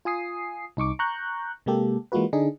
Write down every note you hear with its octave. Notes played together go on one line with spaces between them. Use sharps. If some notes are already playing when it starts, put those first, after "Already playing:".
F4 G#5 D#6 C7
C2 D#4 C#6 D6
A#5 C#6 F#6 G6
C3 G#3 A#3 G4 A4
E3 G#3 A#3 F4 F#4 B4
D3 D4 D#4 G#4